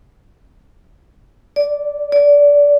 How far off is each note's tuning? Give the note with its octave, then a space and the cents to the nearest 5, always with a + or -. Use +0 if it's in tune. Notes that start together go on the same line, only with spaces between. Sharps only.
D5 -10
D5 -20